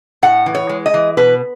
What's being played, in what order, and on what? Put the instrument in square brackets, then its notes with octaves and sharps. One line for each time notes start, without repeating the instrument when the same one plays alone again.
[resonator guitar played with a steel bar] A2 F#5
E3
C#5
G#3
D#5
E3
B2 B4